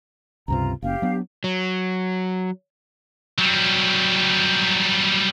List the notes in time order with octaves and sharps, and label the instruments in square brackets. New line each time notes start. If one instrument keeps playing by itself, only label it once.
[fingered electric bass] C#2 G2 C3 [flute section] F4 A#5
[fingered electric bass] F#1 A#3 C#4 [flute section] G4 F5
[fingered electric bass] F#3 B3 D4
[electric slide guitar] F#3
[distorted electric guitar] F#3 G3